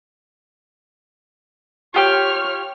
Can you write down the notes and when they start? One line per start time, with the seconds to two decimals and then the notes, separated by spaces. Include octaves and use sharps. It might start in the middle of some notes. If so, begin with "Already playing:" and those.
1.94 F4 G4 C#5 G5 F6